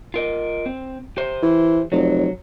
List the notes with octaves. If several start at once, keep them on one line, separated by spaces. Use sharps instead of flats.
F4 A#4 D#5
C4
G4 C5
E3
F1 F#3